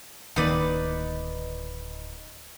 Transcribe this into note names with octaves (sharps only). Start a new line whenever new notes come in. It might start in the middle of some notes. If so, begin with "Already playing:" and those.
D1 D#3 A#3 D#4 B4 D5